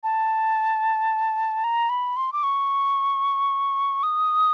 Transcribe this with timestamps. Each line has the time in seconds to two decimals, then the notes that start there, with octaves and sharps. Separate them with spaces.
0.04 A5
1.64 A#5
1.90 B5
2.17 C6
2.33 D6
2.43 C#6
4.03 D#6